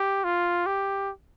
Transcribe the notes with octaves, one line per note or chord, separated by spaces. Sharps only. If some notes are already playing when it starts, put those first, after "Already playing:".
Already playing: G4
F4
G4